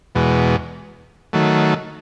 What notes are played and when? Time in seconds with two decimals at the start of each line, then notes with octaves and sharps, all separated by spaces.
0.15 E2 B2 G#3
1.33 D#3 F#3 A3